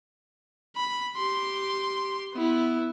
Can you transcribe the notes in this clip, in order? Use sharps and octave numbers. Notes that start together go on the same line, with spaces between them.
B5
G4 C6
B3 E4